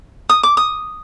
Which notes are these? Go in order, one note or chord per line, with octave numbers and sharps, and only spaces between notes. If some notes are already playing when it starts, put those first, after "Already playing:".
D#6
D6
D#6